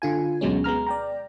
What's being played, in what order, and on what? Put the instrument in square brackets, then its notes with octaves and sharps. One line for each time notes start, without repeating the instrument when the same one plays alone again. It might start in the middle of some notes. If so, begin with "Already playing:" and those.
[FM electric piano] D3 F4 G#5
D2 B2 F#3 G#3 C#4
G#3 B3 A#5 F6
D5 G5 A#5